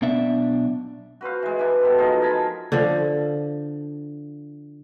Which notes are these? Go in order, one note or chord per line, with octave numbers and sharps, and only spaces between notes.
B1 B2 D4 E5
F#4 B4 C5 F5
E3 G#3
E3 D4
B2 G3 A4
F3 G#3 D#4 F5
A#4 G#5 A5 B5
D3 F3